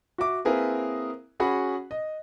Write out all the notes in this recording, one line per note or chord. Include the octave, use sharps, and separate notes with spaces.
F#4 E5 D6
A#3 C4 E4 G#4 A#4 B4
C#4 F#4 G#4 F#5 B5
D#5